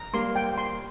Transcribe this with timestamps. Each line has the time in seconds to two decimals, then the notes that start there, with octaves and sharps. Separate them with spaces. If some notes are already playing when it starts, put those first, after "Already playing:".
Already playing: A#5
0.13 G3 A#3 C6
0.36 G5
0.58 C6